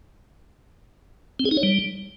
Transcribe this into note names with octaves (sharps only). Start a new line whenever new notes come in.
C4
G#4
D#4
C#5
G3